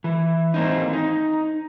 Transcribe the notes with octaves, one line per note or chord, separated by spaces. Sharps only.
E3
A#3 C4 D#4
D#4